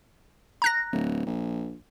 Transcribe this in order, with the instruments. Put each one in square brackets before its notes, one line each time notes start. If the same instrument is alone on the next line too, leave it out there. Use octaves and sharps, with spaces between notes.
[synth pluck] A#5 F#6 A#6
[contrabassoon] D1
A#1